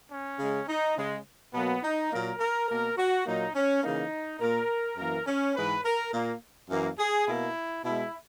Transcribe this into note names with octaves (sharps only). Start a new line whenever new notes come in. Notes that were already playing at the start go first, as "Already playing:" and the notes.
C#4
C#3 G#3
D#4
C#3 G#3
B2 F#3 A#3 B3
D#4
A#2 F#3 A#3 A#4
A#4
B2 A#3 A#4
F#4
A#2 F#3 A#3 D#4
C#4
C#3 E3 A#3 D#4
A#2 A#3 A#4
F#2 E3 A#3 A#4
C#4
G#2 E3 G#3 B4
A#4
A#2 A#3
F#2 E3 A#3
G#4
B2 A#3 E4
B2 G#3 E4